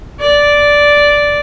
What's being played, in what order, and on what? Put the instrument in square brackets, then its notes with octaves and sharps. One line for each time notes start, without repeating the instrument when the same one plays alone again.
[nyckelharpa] D5